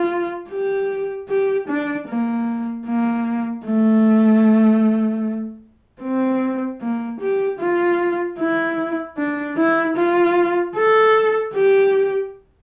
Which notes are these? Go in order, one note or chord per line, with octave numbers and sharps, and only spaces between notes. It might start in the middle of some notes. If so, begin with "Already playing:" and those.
Already playing: F4
G4
G4
D4
A#3
A#3
A3
C4
A#3
G4
F4
E4
D4
E4
F4
A4
G4